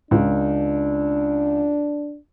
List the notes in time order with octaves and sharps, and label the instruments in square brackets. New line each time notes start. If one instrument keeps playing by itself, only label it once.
[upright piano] C#2 [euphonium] D4